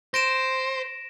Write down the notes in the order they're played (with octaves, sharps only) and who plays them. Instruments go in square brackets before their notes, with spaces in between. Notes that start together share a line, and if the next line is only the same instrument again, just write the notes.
[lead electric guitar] C5 [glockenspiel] A#6 D7 E7